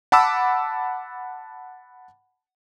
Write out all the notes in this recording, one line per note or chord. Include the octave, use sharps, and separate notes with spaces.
F#5 A5 B5 D6 E6